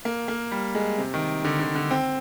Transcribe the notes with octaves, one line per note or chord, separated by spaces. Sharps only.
A#3
A#3
G3
G#3
C3
D#3
D3
D3
D3
C4